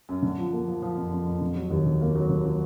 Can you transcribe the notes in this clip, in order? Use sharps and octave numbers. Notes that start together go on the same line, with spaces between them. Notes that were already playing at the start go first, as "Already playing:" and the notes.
F#2
D3
F3
A#3
F3
F3
F2
F2
F2
D3
F#3
D#2
D3
A#3
F#3
D3
F#3